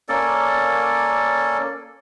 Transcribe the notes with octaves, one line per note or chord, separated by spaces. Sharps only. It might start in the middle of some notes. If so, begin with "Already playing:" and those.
A#3 C#4 A4 D5